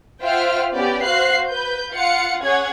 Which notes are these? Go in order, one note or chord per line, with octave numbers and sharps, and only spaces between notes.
F4 C5 E5 F#5 G5 F6
B3 C#4 G4 D5
F#4 C5 F5 F#6 C7
B4 G6
F4 F5 F#5 C#7
C#4 G#4 C#5 F#5 G#6